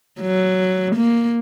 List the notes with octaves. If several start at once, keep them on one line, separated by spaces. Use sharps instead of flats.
F#3
A#3